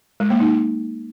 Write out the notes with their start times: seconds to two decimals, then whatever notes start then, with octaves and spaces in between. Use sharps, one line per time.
0.20 G#3
0.30 A#3
0.40 D#4